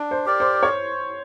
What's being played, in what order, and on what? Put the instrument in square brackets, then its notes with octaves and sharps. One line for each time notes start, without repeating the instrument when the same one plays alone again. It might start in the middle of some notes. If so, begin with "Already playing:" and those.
Already playing: [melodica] D4
[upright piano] C5
[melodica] G4 A#4 D5
[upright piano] C5
C#5